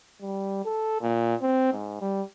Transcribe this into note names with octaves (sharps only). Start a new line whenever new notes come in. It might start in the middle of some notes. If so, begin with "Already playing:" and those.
G3
A4
A#2
C4
G#2
G3